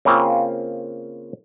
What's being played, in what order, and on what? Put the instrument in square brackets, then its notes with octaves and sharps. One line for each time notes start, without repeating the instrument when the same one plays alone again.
[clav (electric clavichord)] C#3 A#3 C4 F4